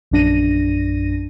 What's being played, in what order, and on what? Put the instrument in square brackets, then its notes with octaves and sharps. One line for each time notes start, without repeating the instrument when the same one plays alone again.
[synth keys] A#1 F#2 D4 A#6 D#7